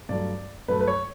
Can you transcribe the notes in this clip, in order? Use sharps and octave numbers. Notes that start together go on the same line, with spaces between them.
G2 F#3 A3 D5
G2 F#3 A3 B4
B4
C#5